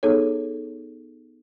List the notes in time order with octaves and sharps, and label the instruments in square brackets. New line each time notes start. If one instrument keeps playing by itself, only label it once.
[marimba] B3 D#4 G#4 A4 C#5